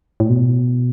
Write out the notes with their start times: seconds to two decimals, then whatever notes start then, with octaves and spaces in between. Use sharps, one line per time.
0.20 A2
0.30 B2